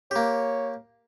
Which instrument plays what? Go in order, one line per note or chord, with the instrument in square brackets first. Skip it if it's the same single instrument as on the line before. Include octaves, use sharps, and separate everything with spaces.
[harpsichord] A#3 G4 [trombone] C#5